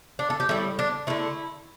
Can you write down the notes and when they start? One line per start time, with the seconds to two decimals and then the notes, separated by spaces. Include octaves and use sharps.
0.19 D4
0.30 A4
0.40 G4
0.49 A2 G3 E4
0.79 D4
1.07 D3 A3 E4